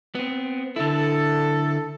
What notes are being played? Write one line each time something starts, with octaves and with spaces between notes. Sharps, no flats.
B3 C4
D3 E4 A4